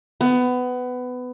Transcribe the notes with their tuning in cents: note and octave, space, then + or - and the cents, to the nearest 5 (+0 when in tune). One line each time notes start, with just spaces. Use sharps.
B3 +20